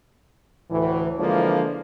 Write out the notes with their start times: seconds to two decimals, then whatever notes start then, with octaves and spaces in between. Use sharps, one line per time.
0.70 D2 A2 E3
1.19 D3 E3 F3 G#3 A#3 D4